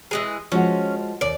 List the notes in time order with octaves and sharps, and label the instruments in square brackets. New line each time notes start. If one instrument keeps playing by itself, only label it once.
[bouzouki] E3 G#3 G#4
[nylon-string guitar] F3 G#3 F#4 [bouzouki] C#4
[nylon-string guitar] D#2 [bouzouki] D5